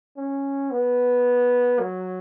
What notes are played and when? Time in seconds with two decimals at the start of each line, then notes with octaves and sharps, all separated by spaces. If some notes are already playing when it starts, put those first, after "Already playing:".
0.17 C#4
0.71 B3
1.80 F#3